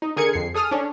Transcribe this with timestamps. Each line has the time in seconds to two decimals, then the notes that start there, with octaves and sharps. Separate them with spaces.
0.02 D#4
0.16 D3 G#4 A#4 G#6 C#7
0.33 F2 C7
0.54 G#4 A4 D#6 F6
0.71 C#4 D4